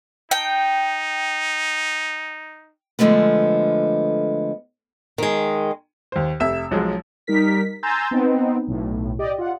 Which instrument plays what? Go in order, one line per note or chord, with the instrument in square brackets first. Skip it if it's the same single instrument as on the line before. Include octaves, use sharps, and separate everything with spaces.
[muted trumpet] D#4 [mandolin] G5
[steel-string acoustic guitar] D3 F3 G#3 A3 B3
D#3 G#3
[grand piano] D#2 C5
F1 E5 E6 E7
B1 F3 F#3 G#3
[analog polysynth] G3 D#4 A#4 B6
G#5 A#5 C6 E6 G6 A6
B3 C4 D#4
B1 A2
G4 D5 D#5
F4 F#5